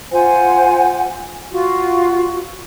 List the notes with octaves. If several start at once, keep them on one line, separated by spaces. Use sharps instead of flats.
F4 C5 F#5 G#5
F4 F#4